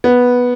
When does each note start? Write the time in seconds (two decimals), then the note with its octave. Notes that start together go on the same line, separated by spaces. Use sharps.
0.04 B3